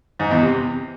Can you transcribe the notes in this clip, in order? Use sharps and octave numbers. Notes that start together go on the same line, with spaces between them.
G#2
E2
C3